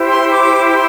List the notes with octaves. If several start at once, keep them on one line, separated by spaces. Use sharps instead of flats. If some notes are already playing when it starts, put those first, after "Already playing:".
Already playing: E4 G4 C5
C6
D6
C6